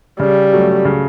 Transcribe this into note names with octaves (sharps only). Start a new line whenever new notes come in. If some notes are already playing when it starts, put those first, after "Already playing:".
C#3 G3
F#3 A3
C#3